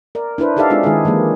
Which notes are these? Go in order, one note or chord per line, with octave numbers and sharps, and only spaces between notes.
A#4 D5
D4 E4 B4 C5
D#4 G4 A4 D5 E5 F5
G#3 C4 D4 D#4 F4 G#4
D#3 G#3 D4 E4 G#4
E3 F3 G#3 A#3